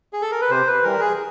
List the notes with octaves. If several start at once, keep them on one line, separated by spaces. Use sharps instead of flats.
G#4
A4
A#4
B4
C3 C5
B4
E3 G3 A#4
G#4